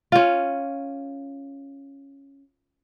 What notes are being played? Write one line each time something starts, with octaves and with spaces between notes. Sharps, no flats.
C#4 F4